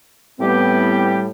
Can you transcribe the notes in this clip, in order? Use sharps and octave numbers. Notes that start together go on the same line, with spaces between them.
A2 E3 G3 B3 C4 G4